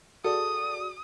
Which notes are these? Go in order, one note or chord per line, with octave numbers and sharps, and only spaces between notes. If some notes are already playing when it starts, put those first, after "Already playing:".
F#4 G#4 A4 D5 D#6